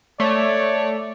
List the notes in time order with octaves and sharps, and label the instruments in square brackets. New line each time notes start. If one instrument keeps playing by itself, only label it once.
[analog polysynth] A3 [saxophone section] C#5 [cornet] D5